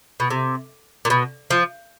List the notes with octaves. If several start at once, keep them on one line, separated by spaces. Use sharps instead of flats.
B2
C3
A#2
B2
F3